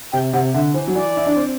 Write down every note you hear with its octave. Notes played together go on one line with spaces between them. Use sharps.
C3 G5
C3 F#5
D3 E5
E3 C5
F#3
E3 D5
E4
D4
C4